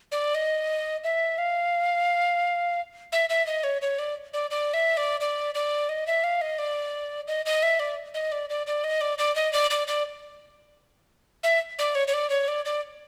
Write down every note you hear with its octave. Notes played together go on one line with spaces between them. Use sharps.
D5
D#5
E5
F5
E5
E5
D#5
C#5
C#5
D5
D5
D5
E5
D5
D5
D5
D#5
E5
F5
D#5
D5
D#5
D#5
E5
D5
D#5
D5
D5
D5
D#5
D5
D5
D#5
D5
D5
D5
E5
D5
C#5
C#5
D5
C#5
D5
D5